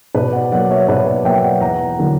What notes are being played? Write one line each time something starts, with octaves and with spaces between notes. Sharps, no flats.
B2 B4 D5
D5 F#5
F#3 A#3 D5 F#5
C#5 E5
B2 B4 D5
D5 F#5
F#3 A#3 E5 G5
D5 F#5
E2 F#5 A#5
D3 F#3 A#3 E4